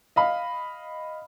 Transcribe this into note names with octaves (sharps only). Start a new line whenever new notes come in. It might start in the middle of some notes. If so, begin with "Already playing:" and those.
D#5 F5 B5